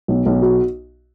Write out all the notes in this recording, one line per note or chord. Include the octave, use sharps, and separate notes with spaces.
B1
B1
F#4